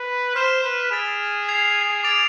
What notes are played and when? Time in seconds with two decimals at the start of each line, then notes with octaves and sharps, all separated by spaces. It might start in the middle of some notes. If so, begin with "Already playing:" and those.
Already playing: B4
0.35 C5 F6 B6 E7
0.64 B4
0.91 G#4 E6 A6 D7 F7
1.48 G#6 C7 F7
2.04 D6 A6 D7 F7